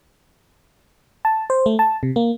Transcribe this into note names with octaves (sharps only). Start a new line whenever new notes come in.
A5
C5
A3
A5
C3
A#3